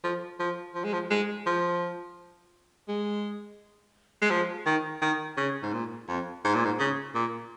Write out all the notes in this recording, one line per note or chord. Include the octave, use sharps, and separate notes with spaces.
F3
F3
F3
G#3
F3
G#3
F3
G#3
G#3
F3
D#3
D#3
C#3
G#2
A#2
F2
G#2
A#2
G#2
C#3
A#2